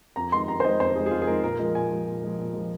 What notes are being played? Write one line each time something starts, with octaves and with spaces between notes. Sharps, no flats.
F2 A#5
D#3 G#3 C6
F2 A#5
C5
D#3 G#3 D#5
F2 C5
D#3 G#3 G#4
G#4
F2 F4
G#4
D#3 G#3 A#4
A#2 A#4
F3 G#3 A#4
A#2 G#5
F3 G#3
A#2
F3 G#3
A#2
F3 G#3